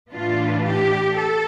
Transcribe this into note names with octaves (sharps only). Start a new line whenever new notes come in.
A2 E3 B3 D4 F4
G4
A4